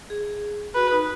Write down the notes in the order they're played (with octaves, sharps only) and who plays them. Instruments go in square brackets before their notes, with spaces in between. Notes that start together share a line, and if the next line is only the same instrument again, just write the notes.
[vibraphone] G#4
[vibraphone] F#4 [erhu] B4
[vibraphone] D#4